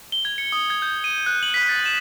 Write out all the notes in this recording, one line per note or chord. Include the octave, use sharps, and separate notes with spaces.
G7
G#6
C#7
D#6
G#6
G6
D#7
F#6
F#7
B6
A6
E7